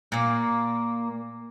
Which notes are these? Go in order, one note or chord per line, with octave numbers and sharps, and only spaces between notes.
A#2 A#3